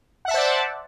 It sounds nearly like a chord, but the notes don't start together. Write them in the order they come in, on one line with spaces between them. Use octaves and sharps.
F#5 E5 A5 C5 D5